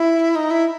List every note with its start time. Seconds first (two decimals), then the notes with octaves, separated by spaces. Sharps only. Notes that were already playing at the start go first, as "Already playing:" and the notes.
Already playing: E4
0.36 D#4
0.50 E4